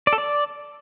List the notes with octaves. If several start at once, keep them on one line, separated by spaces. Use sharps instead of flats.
D5
A4
D5